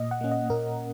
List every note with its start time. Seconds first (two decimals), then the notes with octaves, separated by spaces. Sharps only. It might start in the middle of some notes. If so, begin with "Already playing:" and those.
Already playing: A#2 D#5
0.11 F#5
0.21 A#3 C#4
0.32 D#5
0.50 A#2 A#4